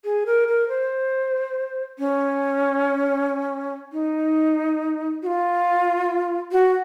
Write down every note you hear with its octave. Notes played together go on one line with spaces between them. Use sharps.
G#4
A#4
A#4
C5
C#4
D#4
F#4
F4
F#4